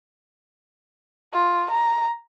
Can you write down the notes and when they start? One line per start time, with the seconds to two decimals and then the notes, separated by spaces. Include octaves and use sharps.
1.33 F4
1.71 A#5